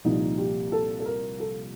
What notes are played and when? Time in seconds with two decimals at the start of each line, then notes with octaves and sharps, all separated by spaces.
0.04 C2 A#2 F3 D#4
0.38 G4
0.72 A4
0.99 A4
1.05 A#4
1.40 A4